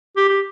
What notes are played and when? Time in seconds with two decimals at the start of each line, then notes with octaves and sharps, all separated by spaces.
0.16 G4
0.29 G4